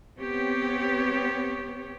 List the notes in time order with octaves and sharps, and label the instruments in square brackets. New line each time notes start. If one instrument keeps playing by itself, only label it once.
[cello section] B3 C4 G4 C#5